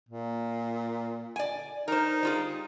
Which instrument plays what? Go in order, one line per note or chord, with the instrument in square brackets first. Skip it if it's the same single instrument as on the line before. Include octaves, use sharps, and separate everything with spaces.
[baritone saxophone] A#2
[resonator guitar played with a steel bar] D5 G#5
[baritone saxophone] D#4 [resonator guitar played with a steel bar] A#4 C5
[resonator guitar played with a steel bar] G3 F4 G#4